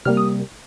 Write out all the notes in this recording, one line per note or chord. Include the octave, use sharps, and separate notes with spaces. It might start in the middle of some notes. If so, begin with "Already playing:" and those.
C3 G3 A#3 F6
D#6